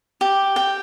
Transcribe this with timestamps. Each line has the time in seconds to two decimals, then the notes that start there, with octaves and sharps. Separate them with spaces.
0.21 G4
0.56 G5